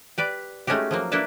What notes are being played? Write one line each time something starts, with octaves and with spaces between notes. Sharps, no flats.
G4 B4 D5
G#3 A3 C#4 D#4 F#4 G4
F3 F#3 A#3
A#3 D4 E4 A4 B4 A5